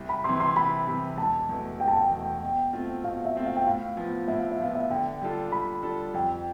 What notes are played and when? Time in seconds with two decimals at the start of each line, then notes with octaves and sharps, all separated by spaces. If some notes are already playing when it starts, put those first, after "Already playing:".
Already playing: C2
0.09 B5
0.24 C3 E3 C6
0.40 C6
0.56 C2 B5
0.87 C3 E3
1.17 E1 A5
1.49 E2 B2 A3
1.80 E1 G5
1.88 A5
1.96 G5
2.11 E2 B2 A3
2.42 B2
2.73 A3 C4 F4
3.04 B2 F5
3.25 E5
3.35 A3 C4 F4
3.46 F5
3.56 G5
3.66 A2 F5
3.97 F3 B3
4.28 A2 E5
4.39 F5
4.52 E5
4.59 F3 B3 F5
4.75 E5
4.90 D3 G5
5.21 G3 D4 F4 A4
5.52 D3 B5
5.83 G3 D4 F4 A4
6.14 F2 G5